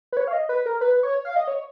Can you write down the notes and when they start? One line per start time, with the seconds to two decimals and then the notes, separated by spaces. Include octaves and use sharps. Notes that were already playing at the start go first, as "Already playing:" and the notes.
0.12 B4
0.17 C#5
0.28 F5
0.33 D#5
0.49 B4
0.66 A#4
0.81 B4
1.03 C#5
1.25 F5
1.36 D#5
1.48 C#5